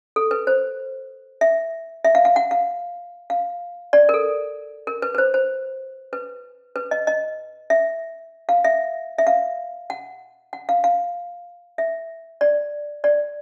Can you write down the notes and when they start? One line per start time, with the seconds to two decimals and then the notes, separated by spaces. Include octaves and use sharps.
0.16 A4
0.31 B4
0.47 C5
1.41 E5
2.04 E5
2.15 F5
2.25 F5
2.36 F#5
2.51 F5
3.30 F5
3.93 D5
4.09 A#4
4.14 A4
4.87 A#4
5.02 B4
5.15 B4
5.18 C5
5.34 C5
6.13 B4
6.76 B4
6.91 D#5
7.07 D#5
7.70 E5
8.49 F5
8.64 E5
9.18 E5
9.27 F5
9.90 F#5
10.53 F#5
10.69 F5
10.84 F5
11.78 E5
12.41 D5
13.04 D5